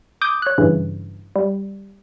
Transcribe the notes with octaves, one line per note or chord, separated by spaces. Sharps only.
D6 D#6 G6
C#5 F#6
G2 C#3 E3
G3